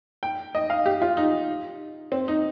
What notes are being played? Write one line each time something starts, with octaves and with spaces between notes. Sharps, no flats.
G5
D#5
F5
G4
F4
D#4
C4
D#4